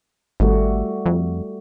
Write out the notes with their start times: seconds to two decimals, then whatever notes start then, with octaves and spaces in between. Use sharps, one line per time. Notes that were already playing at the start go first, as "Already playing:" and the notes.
0.40 G#1 G3 A3 F#4
1.06 F2